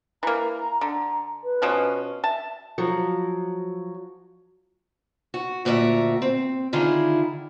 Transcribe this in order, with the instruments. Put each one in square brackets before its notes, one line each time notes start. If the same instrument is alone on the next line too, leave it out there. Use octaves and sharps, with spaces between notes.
[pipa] E3 A#3 [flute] A#5
[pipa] D3 [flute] A#5
[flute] B4
[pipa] B2 F3 C#4
[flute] E5 [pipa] A5
[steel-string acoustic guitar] F3 F#3
F#4
D2 A#2 F#4 G4 A#4 E5
C4
D3 D#3 E4 F4 G#4